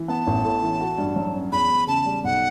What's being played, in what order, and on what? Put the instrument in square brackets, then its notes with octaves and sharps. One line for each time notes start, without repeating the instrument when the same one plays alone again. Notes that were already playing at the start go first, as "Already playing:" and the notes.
Already playing: [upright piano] E3
[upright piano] B3 [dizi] A5
[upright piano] A1
A2
E3
F#4
G2
F#3
C#4
[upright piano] E2 [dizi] B5
[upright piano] E2
[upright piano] C#3 [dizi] A5
[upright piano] G3
[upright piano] B1 [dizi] F#5